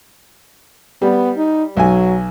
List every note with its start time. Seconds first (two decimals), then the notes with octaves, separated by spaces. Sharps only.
1.02 G3 B3
1.37 D#4
1.77 B1 F#3 G#5